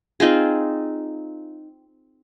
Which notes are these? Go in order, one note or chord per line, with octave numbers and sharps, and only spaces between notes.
C4 D#4 F4 G#4